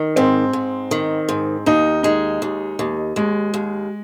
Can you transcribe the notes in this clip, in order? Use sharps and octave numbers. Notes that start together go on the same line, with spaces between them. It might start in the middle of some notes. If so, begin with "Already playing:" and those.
Already playing: D#3
G#2 C4
G#2
D#3
G#2
D#2 D#4
G#3 D#4
D#2
D#2
D#2 G#3
D#2